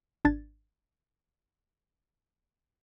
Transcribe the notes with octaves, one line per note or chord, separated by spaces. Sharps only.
G#1 D4 G#6 A6